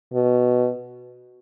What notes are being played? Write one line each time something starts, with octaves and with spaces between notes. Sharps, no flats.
B2